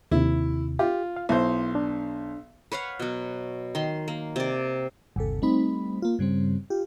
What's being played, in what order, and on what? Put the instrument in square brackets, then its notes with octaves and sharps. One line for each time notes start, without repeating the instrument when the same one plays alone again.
[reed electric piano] D#2 C3 [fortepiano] E4
[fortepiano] F4 [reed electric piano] G4
[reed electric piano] F5
[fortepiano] B1 C5 [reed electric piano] E4
[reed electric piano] D4
[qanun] B4 C#5 F5 F#5
B2 F#3
D#3 C6
A#3
C3 D5
[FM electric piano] G1 D#2 C3 A4
G3 A3 C4 D#4 B5
A#3 F4
G2 C#3 G3 C4
F4 G4